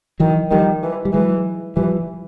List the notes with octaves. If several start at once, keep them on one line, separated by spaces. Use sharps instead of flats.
D#3 E3 F#3
D#3 F3 G3
E3
G3
E3 F#3 G#3
E3 F3 G3